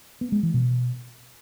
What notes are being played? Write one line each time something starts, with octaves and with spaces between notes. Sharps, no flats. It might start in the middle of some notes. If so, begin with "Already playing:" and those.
B3
G#3
E3
B2